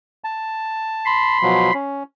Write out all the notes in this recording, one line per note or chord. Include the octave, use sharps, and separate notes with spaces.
A5
B5 C6
B2 F3 F#3
C#4